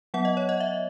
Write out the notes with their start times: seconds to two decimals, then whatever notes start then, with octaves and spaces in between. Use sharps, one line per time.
0.14 F#3 B3 F#5
0.25 D#5
0.37 C#5
0.49 D#5
0.60 E5